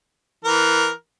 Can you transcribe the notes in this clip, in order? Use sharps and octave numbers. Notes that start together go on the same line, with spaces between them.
E3 A#4